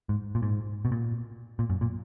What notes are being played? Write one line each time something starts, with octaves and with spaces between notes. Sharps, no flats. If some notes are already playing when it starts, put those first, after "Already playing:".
G#2
A#2
G#2
B2
A#2
A#2
F#2
A#2